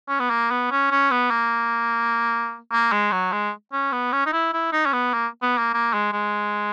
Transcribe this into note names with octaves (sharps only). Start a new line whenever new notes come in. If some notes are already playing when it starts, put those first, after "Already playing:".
C#4
B3
A#3
B3
C#4
C#4
B3
A#3
A#3
G#3
F#3
G#3
C#4
B3
C#4
D#4
E4
E4
D#4
C#4
B3
A#3
B3
A#3
A#3
G#3
G#3